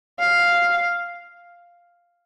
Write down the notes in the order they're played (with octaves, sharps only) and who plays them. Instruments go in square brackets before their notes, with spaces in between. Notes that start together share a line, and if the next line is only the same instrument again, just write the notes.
[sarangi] F5